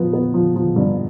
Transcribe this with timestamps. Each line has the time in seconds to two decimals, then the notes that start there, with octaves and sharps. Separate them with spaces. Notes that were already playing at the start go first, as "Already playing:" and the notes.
Already playing: F3 B3
0.13 B3
0.34 F3
0.56 F3
0.76 G2